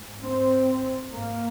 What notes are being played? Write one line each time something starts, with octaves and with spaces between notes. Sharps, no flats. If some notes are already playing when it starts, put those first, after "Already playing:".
Already playing: G#2
C4
G#2 A#3